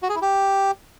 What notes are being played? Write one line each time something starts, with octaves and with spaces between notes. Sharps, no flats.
F#4
G#4
E4
G4